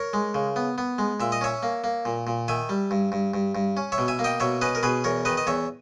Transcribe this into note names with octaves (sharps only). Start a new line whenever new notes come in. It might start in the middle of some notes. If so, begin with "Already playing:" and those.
Already playing: A#4 C#5
G#3
C#3
B3
B3
G#3
A#2 E5
D#5
C#4 C#5 E5
A#3
A#3
A#2
A#2
D#3 E5 G#5
G3
G2
G2
G2
G2
C#4
C#5 E5
B2
E5 G#5
A#3
D#5 G5
B2 C#5 E5
C#4 B4 D#5
A#4
B2 G#4 B4
E2 A#4 C#5
D#3 B4 D#5
D#5
E2 C#5 E5